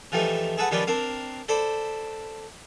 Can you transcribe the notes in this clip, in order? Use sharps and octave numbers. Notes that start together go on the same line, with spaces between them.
E3 F3 G3 A3 D#4
G#4 A4 B4 F#5
D#3 F3 G3 C#4 B4 D5
C4 D4 A#4 F5
A4 C5 D5 B5